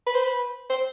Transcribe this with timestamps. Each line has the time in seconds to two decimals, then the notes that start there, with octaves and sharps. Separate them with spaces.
0.07 B4
0.15 C5
0.24 B4
0.70 C5